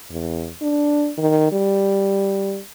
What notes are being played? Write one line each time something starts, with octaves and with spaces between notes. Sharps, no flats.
E2
D4
D#3
G3